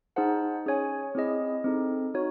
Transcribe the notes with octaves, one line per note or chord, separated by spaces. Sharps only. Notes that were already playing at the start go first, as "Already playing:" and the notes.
D#4 G#4 C5 F#5 A5
C#4 G#4 C#5 G#5
C4 E4 G#4 D#5
C4 D#4 A4
D#4 F#4 C#5